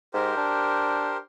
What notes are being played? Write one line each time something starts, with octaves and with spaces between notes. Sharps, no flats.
G#2 G4 A#4 C5
D4